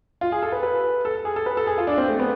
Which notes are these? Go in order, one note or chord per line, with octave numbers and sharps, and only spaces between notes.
F4
G#4
A4
B4
B4
A4
G#4
A4
B4
A4
G#4
F4
D4
C4
A3
B3